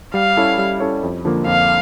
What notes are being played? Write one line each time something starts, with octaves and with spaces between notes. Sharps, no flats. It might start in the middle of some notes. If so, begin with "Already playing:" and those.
G3 F5
C#4 E4 A4 C#5
G3
C#4 E4 A4 C#5
F2
D3 F3 A#3
F2 F5